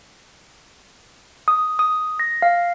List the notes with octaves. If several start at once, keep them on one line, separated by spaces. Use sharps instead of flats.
D#6
D#6
A#6
F5